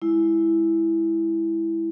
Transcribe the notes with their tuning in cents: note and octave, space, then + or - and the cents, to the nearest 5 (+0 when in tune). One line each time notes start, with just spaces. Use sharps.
G#3 +0 E4 +0